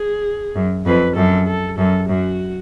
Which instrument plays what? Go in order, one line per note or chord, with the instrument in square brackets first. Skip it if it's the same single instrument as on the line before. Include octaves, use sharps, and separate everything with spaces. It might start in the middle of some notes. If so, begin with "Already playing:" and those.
Already playing: [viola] G#4
[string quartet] F#2
[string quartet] F2 [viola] B4
[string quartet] F#2 [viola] A4
[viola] A4
[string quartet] F#2 [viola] A4
[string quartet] F#2 [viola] F#4